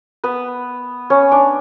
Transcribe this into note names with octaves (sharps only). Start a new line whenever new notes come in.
B3 B4
C#4 C#5
D4 D5